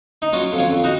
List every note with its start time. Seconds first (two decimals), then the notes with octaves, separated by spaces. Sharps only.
0.22 D#4
0.33 F#3 C#4 F4
0.52 F2
0.58 C#4 F4
0.71 F2
0.84 D#4 F#4